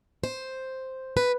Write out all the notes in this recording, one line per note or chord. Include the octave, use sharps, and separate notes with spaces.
C5
B4